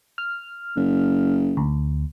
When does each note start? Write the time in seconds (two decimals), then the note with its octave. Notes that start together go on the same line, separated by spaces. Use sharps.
0.18 F6
0.76 F#1
1.57 D2